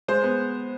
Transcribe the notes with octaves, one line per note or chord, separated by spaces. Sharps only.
G#3 C5
B3